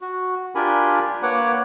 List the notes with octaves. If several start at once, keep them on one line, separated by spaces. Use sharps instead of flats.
F#4
D4 F4 G4 A#4 G#5 B5
A#3 B4 C#5 F#5 D6 F#6